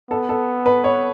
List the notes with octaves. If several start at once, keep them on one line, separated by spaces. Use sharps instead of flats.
B3 A4
A4
B4
C#5